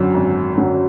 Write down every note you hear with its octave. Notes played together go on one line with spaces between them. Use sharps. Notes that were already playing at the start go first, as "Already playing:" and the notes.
Already playing: G#1 F#2 D3 F#3 C#4
G#1
F#2 D3 F#3 C#4